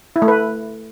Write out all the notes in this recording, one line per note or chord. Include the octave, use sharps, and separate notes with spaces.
E4
A3
B4